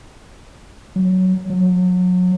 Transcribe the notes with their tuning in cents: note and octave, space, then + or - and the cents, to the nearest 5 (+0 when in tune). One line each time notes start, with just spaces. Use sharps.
F#3 +5
F#3 -30